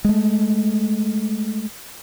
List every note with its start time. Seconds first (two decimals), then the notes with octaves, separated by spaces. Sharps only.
0.05 G#3 A3